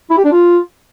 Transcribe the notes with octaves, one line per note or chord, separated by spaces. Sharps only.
E4
G4
D4
F4